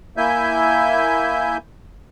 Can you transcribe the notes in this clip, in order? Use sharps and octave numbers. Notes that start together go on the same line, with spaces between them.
A#3 E4 E5 G#5 G6